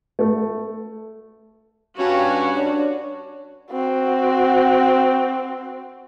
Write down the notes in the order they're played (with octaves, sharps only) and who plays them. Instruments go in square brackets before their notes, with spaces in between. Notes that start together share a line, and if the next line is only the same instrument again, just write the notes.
[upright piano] A3
[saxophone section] G2 C#4 [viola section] F#4 [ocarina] F5
[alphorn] D4 [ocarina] C#5
[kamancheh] C4 F#4